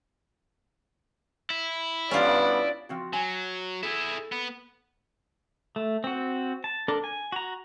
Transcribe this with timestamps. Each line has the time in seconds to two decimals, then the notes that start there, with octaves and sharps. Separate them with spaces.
1.50 E4
2.11 G2 B3 C#4 F4 D5
2.89 F3 C4 F#4
3.13 F#3 G#5
3.83 E4 G#4 A4
4.32 B3
5.76 A3
6.04 C4 F#4
6.64 A5
6.88 D4 A4 A#4
7.04 G#5
7.32 F#4 A#5